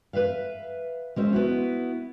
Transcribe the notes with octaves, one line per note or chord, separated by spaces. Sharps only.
B4 C5 E5 F5
G#3 C#4 C5 E5
B3 E4 F#4